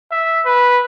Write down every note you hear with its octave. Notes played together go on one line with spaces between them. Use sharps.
E5
B4